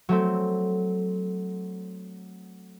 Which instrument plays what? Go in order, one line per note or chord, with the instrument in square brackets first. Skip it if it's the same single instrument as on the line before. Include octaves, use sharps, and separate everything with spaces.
[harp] F#3 A3 C4